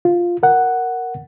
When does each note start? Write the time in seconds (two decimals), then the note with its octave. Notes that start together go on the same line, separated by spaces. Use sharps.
0.05 F4
0.43 A#4 F#5